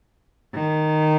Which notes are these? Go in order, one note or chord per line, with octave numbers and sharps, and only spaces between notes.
D#3